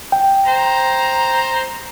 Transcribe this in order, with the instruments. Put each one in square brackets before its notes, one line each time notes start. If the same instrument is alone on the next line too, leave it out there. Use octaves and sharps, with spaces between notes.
[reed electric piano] G5
[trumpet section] C5 A#5